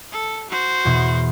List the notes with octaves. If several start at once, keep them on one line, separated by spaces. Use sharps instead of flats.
A4
F#4 C5
E2 B2 E4